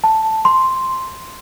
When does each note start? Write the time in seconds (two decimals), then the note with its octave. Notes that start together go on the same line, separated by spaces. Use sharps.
0.04 A5
0.45 C6